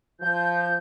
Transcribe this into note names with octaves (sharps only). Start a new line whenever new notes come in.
F3 G6